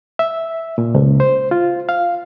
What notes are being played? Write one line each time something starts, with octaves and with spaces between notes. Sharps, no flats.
E5
A#2
C#2
C5
F4
F5